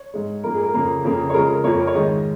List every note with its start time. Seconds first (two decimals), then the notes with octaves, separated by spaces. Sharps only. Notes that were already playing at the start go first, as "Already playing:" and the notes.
Already playing: C#5
0.14 G#2 G#3
0.44 G#2 F3 A#3 A#4
0.54 G#4
0.63 A#4
0.74 F2 C#3 A#3
1.04 F2 C#3 A#3
1.30 C#5
1.34 C#3 F3 G#3 A#4
1.49 A#4
1.64 F2 F3 A#3 C#5
1.80 A#4
1.87 C#5
1.95 G#2 D#3 G#3 D#5